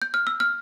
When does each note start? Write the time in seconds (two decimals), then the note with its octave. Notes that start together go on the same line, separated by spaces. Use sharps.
0.02 G6
0.14 F6
0.27 E6
0.40 F6